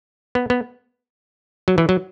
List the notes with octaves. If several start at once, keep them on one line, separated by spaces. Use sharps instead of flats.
B3
B3
F#3
E3
F#3